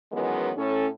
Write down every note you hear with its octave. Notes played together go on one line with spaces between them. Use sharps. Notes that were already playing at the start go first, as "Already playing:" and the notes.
D#3 E3 F#3 G#3 B3 C#4
A2 C#4 A4